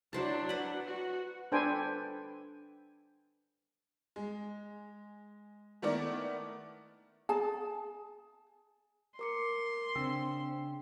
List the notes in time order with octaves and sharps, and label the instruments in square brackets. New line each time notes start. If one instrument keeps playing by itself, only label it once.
[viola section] F#3 D4 [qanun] E4 C5 A5
[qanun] B4 F#5
[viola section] F#4
[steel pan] D4 A4 B4 C5 G5 G#5
[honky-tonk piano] G#3
D#3 A3 B3 E4 A#4 D5
[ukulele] G#4 A5
[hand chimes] A#4 D6 C#7 [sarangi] C6
[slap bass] C#3 [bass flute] C4 [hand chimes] D4 G5 E6